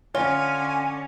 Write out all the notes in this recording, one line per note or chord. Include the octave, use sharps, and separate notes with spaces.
D3 C#4 F4 C#5 G#5